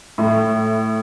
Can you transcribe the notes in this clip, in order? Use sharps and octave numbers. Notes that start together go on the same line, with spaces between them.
A2